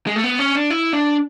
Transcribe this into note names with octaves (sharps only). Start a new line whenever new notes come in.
G#3
A3
B3
C#4
D4
E4
D4